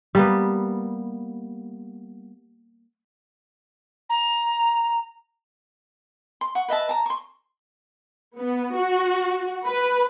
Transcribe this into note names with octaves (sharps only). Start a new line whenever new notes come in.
G3 A#3 B3
A#5
C6
F#5 C#6
B4 D#5 E5 A5
A5 A#5
C6 C#6
B3
F#4
B4